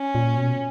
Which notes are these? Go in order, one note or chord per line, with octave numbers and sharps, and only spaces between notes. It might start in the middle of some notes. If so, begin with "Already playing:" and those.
Already playing: C#4
A#2
B2